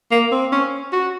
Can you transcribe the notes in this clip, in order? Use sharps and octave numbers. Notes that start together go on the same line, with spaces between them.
A#3
C4
C#4
F#4